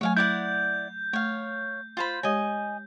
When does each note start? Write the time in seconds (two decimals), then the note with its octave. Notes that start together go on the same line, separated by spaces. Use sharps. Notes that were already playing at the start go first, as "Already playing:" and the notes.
0.01 F#3 A3 C#5 F5 G#5
0.17 E4 D5 F#5 G6
1.13 A3 C#5 F5
1.97 F4 C5 B5
2.23 G#3 G4 C#5 D#5 G#5